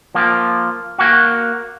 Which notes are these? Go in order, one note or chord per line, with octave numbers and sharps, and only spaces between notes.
F3 A#3
A#3 F#4